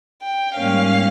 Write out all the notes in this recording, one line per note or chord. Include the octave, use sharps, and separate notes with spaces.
G5
G#2 G3 A#3 C#4 F5